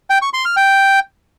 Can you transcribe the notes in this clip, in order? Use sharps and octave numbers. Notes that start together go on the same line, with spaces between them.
G5
C#6
C6
F6
G5